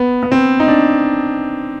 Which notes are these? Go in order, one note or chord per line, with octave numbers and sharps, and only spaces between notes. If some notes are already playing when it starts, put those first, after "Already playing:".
Already playing: B3
B3
C4
D#4
D4